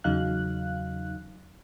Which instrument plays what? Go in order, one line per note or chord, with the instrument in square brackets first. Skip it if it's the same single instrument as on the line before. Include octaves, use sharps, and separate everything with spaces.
[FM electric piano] E2 C#3 F#3 D#4 F5 F#6